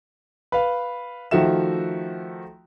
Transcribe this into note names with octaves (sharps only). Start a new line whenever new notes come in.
B4 F5
D#3 F3 A3 F#4 E5 E7